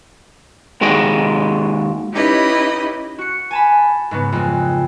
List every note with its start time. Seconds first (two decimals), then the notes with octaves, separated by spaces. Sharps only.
0.81 D#2 G#3 F#4 D#5 G5
2.13 C#4 D#4 E4 G4 B4 D#5
3.18 F#4 C#7
3.51 G#5 A5 B5
4.11 G#2 C#3 B3
4.32 F2 G#3